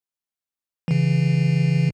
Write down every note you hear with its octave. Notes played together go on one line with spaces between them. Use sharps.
C#3 E3